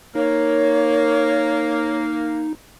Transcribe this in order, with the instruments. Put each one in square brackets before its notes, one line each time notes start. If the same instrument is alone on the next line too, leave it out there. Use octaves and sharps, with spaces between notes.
[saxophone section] A#3 [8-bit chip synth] D#4 [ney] C#5